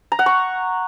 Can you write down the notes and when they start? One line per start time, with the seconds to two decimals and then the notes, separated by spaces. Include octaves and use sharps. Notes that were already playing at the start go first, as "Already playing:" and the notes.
0.12 A#5
0.19 F#5
0.26 C#6